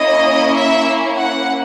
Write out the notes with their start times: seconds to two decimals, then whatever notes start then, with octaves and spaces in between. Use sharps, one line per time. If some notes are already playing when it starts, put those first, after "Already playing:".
Already playing: A#3 C#4 E4 D#5
0.55 E5
1.16 F#5